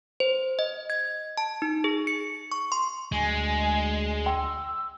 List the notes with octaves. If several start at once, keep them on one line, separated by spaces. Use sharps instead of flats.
C5
D#5
G#6
A5
D#4
G#4
C#7
C#6
C6
D2 G#3 G#5
G5 C6 E6